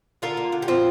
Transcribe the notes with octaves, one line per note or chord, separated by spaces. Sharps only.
D3 F4 A#4
A#3
D3
G4
A#2 C4 F4